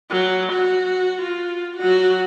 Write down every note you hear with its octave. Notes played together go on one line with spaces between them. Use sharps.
F#3
F#4
F4
F#3 F#4